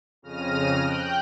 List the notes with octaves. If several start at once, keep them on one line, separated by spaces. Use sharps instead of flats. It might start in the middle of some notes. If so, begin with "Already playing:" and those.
F2 C#3 F6 A#6 D#7
G5 F#6 G6